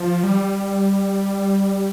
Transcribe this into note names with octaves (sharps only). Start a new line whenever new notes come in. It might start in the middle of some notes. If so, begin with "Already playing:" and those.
Already playing: F3
G3